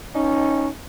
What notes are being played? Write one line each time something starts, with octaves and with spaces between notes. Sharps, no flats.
C#4 D#4